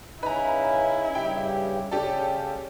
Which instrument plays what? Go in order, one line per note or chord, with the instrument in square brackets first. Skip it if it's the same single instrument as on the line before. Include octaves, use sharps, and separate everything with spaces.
[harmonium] C#3 C#4 [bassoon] D#4 [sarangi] E4 [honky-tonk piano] B4 A#5
[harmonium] G2 C#3 G4 [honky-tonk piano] G5
[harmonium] C#3 [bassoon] G3 [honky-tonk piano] C#4 G4 A4